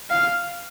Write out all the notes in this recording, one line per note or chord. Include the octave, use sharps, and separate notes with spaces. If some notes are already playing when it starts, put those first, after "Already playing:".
F5